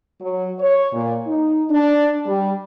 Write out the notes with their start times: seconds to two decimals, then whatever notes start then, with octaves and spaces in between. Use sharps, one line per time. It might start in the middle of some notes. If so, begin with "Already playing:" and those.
0.21 F#3
0.59 C#5
0.93 A#2
1.27 D#4
1.70 D4
2.26 G3